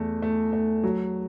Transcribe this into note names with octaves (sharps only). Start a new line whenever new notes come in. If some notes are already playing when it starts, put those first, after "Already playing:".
Already playing: E2 A3
A3
A3
F#3